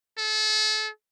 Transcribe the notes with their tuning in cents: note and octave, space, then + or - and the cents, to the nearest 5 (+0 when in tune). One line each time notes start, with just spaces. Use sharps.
A4 -30